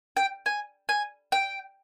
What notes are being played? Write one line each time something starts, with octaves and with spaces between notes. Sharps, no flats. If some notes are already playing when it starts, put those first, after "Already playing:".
G5
G#5
G#5
G5